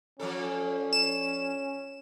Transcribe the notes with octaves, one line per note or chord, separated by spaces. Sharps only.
F3 C#4 D4 A4
E7